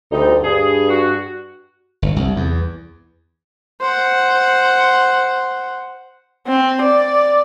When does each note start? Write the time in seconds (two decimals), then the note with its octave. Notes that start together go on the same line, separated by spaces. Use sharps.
0.11 D2 G3 C4 D#4
0.43 G2 G#4
0.89 F#4
2.02 G1
2.16 C2
2.36 E2
3.81 C5 F#5
6.47 C4
6.82 D5